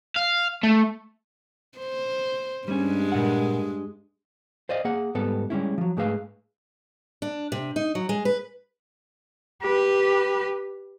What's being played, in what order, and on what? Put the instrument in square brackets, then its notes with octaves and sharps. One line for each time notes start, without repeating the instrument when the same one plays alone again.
[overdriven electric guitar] F5
A3
[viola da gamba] C5
[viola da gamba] G2 G#3 [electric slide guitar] G3 C#4
[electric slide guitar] A#2 F#5
[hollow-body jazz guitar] C5 D5 D#5 F5
A#3 G#4 F#5
G#2 G3 B3 A4
G3 G#3 C#4 E4
F3 F#3
G#2 A3 G#4 B4 F5
[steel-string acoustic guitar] D4
C3
D#4
F#3
G#3
B4
[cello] G4 B4